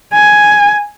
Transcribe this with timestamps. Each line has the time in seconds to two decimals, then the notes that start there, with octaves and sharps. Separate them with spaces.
0.14 G#5